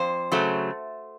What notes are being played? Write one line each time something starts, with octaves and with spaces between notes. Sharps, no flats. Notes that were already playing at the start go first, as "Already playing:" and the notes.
Already playing: F2 C5
C#3 F#3 A3